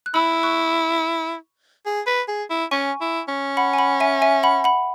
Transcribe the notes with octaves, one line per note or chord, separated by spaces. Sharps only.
F#6
E4 B5 E6
C#6 F#6
G#4
B4
G#4
E4
C#4 G#5 C#6
E4
C#4
F#5 B5
G#5
F#5 B5
E5 G#5
E5 G#5
F#5 B5
F#5 B5